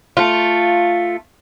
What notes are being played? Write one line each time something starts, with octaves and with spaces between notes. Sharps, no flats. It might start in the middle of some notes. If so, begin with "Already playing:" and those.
A3 F4